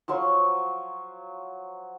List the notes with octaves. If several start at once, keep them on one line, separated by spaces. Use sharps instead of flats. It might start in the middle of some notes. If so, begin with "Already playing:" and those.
F3 F#3 C6 C#6